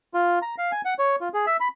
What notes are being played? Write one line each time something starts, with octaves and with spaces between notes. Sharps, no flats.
F4
A#5
F5
G#5
F#5
C#5
F4
G#4
E5
B5